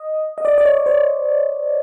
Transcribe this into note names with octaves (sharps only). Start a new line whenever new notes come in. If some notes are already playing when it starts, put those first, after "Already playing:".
Already playing: D#5
D#5
D5
D5
C#5
C5